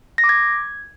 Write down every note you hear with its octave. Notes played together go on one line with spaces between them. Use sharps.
A#6
D6
G#6